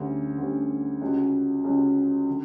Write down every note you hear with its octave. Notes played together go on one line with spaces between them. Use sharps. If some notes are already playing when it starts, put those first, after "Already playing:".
Already playing: D2 D3 G3 C#4
D2 D3 G3 C#4
C#2 C#3 G3 C#4 F#4
C#2 C#3 G3 C#4 F#4
D3